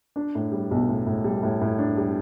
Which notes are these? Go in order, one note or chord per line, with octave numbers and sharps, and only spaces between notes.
D4
A2
G3
B1
A2
A2
G3
A2
A2
D4
G3